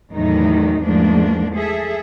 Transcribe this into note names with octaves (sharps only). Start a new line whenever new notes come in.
E2 A2 D#3 F#3 D#4
E2 G#2 F3 A3 A#3 D4
G#4 A4 E5